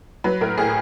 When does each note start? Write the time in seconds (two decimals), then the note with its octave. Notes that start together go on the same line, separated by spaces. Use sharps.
0.24 F#3 B4
0.41 A2 A#4
0.58 A2 G#4